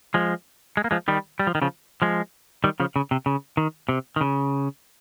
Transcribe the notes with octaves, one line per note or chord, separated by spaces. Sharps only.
F3 G#3
G#3
A#3
F3 G#3
D#3 G3
G3
F3
D#3
C#3 F3
F3 G#3
D#3 G3
C#3 F3
C#3
C3
C#3
D#3
C3
D#3
C#3